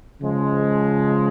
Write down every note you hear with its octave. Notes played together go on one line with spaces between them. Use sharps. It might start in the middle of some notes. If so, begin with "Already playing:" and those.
C#3 F3 G#3